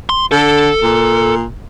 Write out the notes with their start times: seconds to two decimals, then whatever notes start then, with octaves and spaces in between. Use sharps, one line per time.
0.09 C6
0.32 D3 A4
0.83 A#2